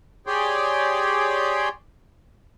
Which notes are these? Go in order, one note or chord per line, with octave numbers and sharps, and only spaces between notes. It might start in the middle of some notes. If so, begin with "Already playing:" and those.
G4 G#4 C#5 D5 G5 C6